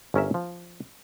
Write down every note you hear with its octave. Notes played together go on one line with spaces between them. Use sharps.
G1 C#4 A#4 E5
F3